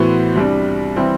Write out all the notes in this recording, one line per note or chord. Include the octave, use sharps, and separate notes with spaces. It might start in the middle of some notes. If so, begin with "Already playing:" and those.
Already playing: A2 E3 B3 F#4 C5
C2 C3 G3 D4
C3 E3 G3 C4 E4